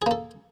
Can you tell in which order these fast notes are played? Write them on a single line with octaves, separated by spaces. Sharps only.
G#4 A#3 A4